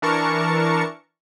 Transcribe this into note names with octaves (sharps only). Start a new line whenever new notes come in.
E3 D4 A#4 A5 C#6 C#7